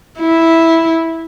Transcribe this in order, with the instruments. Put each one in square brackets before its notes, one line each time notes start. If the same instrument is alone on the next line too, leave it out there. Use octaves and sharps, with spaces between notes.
[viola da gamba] E4